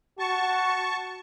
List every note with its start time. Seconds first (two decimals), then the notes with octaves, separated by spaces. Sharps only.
0.19 F#4 A5 C#6